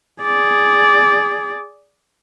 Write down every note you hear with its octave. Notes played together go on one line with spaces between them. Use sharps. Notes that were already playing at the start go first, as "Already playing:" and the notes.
G#4 D5